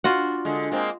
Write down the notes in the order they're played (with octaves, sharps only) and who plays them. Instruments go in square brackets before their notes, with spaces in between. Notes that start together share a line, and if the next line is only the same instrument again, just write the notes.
[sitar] D4 [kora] F4 F#4 F#5
[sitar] D3 G#3
G#3 A#3 C4